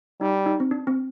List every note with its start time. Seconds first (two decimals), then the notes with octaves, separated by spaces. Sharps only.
0.21 G3 D#4
0.46 D#4
0.60 C4
0.71 D4
0.87 C4